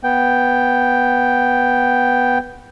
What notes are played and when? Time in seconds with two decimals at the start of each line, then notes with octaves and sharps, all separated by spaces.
0.04 B3 G5